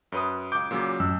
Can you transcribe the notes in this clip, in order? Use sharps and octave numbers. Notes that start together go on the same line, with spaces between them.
F#2 B4 D#6
C#2 D6 G6
A#2 C#3 F#3
A1 F#2 E6